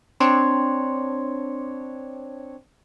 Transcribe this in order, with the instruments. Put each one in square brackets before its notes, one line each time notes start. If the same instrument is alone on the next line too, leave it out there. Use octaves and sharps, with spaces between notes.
[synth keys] C4 D4 C#5 [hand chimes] C6